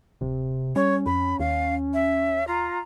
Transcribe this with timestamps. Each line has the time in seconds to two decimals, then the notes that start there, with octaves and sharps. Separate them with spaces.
0.21 D1 C3
0.76 G3 C#4 C#5
1.06 F2 B5
1.40 D#2 F5
1.94 E5
2.47 F4 A#5